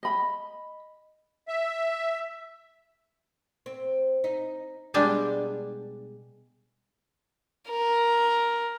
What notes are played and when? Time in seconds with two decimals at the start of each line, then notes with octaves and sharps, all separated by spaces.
0.03 D#5 B5
1.48 E5
3.66 C4
4.24 D#4
4.94 B2 G3 G#3 D4
7.70 A#4